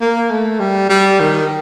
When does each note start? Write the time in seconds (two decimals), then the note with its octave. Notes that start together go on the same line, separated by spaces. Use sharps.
0.01 A#3
0.31 A3
0.60 G3
0.89 G3
1.20 D#3